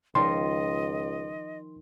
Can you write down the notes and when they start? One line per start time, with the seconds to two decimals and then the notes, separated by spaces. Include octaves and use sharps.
0.15 C#2 D#3 F3 F4 D#5 C6